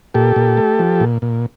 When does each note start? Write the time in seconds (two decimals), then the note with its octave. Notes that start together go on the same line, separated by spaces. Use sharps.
0.14 A#2 G4 A4
0.36 A#2
0.57 A3
0.79 F3
1.00 A#2
1.22 A#2